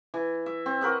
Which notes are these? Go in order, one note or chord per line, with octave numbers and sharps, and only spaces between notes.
E3
E5
C4
F#4 A#4 B4 D#5